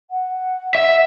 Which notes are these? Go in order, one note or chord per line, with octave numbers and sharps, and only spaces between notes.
F#5
E5